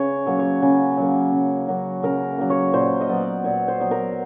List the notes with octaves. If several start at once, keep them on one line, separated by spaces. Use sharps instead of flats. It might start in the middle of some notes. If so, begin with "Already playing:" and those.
Already playing: C#3 C#5
F#3 A#3
C#5
C#3
F#3 A#3
C#3
F#3 A#3
C#3 A#4
F#3 A#3
C#5
A#2 C5
D#5
F#3 B3 D5
A#2 C#5
C5
F#3 B3
A#4